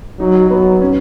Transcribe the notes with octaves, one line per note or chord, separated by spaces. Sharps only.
F#3 D#4
F#3 B3
C#4